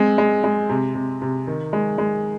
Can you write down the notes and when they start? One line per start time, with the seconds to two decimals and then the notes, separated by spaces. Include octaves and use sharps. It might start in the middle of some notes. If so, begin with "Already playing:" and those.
Already playing: G#3 C4
0.18 G#3
0.44 G#3
0.69 C3
0.95 C3
1.22 C3
1.47 D#3
1.73 G#3
1.98 G#3